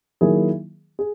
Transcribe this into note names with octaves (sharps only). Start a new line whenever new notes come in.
D#3 F#3 A#3 E4 G#4
G#4